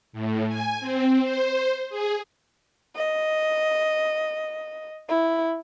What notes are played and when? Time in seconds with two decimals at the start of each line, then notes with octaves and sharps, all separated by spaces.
0.13 A2
0.48 G#5
0.80 C4
1.23 C5
1.90 G#4
2.95 D#5
5.09 E4